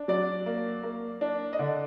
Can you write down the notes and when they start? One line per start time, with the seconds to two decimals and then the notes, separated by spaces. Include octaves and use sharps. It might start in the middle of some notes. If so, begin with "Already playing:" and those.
Already playing: D4
0.08 F#3 D5
0.46 A#3
0.83 A#3
1.21 D4
1.53 D#5
1.59 D3 D5